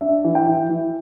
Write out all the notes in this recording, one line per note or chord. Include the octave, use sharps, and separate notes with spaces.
D4 E5
E3
G5
E3
E3